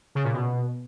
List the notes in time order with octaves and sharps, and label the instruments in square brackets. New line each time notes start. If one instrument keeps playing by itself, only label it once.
[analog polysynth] C#3
A#2
B2